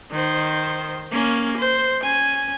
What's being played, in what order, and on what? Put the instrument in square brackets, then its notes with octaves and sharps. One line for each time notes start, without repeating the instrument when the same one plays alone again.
[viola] D#3 C5
A#3 C#4
C5
C#4 G#5